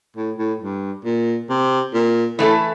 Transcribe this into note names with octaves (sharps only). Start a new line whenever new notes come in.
A2
A2
G2
A#2
C3
A#2
A2 E3 A3 E4 A4